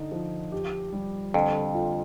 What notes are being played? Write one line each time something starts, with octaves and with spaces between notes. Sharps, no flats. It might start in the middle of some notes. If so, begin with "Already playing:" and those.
Already playing: D3 D#4
F3
G4
G3
F2 D3
F4